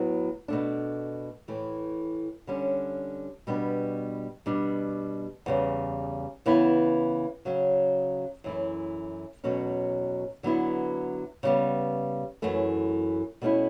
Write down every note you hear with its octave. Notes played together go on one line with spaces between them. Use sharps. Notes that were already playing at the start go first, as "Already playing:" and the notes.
Already playing: A2 F#3 B3
B2 A3 D4
A2 E3 A3
D3 G3 C#4
B2 G3 B3 D4
B2 G3 D4
E2 C#3 G3
C#3 E3 B3 E4
C#3 F#3 C#4
F#2 E3 A3 E4
E2 B2 F#3 A3 C#4
D3 F#3 B3 E4
C#3 G3 B3
F#2 E3 A3
B2 A3 C#4 E4